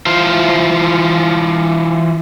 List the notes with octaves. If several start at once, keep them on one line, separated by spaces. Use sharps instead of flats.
E3 F4 C5